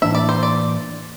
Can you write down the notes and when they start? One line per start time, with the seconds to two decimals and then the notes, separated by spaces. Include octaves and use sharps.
0.02 A2 E3 A#3 D4 E5
0.15 D5
0.29 C5
0.43 D5